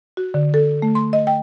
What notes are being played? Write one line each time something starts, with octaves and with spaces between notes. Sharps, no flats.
F#4
D3
A4
A3
C6
D#5
G5